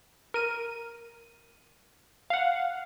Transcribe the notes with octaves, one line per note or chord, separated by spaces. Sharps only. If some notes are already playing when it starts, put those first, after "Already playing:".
A#4 D#7
F5 F#5